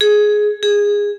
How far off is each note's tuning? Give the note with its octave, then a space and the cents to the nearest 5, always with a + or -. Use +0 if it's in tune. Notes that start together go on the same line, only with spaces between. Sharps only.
G#4 +10
G#4 -15